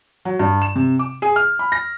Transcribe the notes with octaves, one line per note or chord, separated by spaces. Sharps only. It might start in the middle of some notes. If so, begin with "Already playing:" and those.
F#3
G2
E7
C3
D6
G#4
F6
B5
A#6